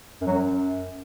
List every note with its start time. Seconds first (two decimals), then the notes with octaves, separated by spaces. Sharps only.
0.21 F#2
0.27 F#3
0.32 F#2